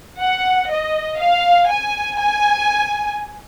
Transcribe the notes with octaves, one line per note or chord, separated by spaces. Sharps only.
F#5
D#5
F5
G#5
G#5